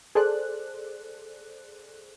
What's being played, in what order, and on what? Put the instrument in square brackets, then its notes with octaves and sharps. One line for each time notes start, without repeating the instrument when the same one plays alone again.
[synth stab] G#4 A4 C5 D5 F#6